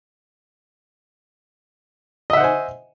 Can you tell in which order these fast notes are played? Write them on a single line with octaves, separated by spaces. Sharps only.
D#5 E5 F#5 C5 G#5